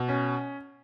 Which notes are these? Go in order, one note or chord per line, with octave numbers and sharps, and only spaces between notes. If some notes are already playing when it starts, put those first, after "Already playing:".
Already playing: B2
C#4